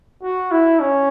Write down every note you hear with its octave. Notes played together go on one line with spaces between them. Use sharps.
F#4
E4
C#4